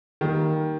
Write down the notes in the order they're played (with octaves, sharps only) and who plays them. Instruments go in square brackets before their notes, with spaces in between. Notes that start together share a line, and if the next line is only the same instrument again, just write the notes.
[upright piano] D#3 G3 A#3